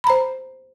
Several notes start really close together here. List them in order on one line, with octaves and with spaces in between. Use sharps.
B5 A#5 C5